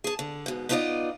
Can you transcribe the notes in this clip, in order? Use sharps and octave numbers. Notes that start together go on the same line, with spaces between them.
G#4 A5
D3
G#2 B2
B3 D#4 F4 A#4 D5 D#5